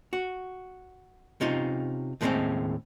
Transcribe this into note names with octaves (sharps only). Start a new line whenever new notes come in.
F#4
C3 C#4 D#4 F4
D#2 A2 G#3 A#3 C4 C#4